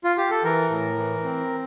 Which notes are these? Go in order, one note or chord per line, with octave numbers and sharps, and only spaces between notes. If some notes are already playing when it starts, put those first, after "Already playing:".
F4
G4
A4
E3 A#4
A2
E3
C4